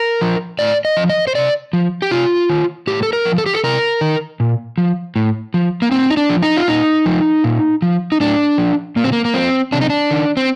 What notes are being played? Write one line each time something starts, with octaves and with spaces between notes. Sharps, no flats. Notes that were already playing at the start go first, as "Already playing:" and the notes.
Already playing: A#4
F3
A2 D5
D#5
F3
D#5
C5
C3 D5
F3
G4
C3 F4
D#3
A2 G4
A4
A#4
F3
A4
G4
A4
C3 A#4
D#3
A#2
F3
A2
F3
A#3
A2 C4
D#4
D4
F3
D#4
F4
A#2 D#4
F3
A#2
F3
D#4
A2 D4
F3
A#2 A#3
C4
A#3
A#3
F3 C4
C3 D4
D#4
D4
D#3
C4